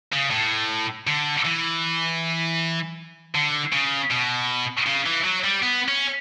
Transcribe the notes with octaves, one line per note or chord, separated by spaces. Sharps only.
C#3
A2
D3
E3
D3
C#3
B2
C#3
E3
F#3
G3
B3
C#4